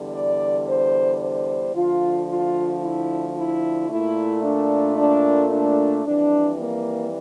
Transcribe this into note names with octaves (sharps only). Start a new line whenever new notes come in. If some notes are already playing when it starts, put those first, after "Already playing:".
Already playing: E2 D3 G3
D5
C5
C5
D2 D3 F3 F4
F4
E4
E4
A#2 A3 E4
D4
D4
D4
F2 E3 G3 D4
A#3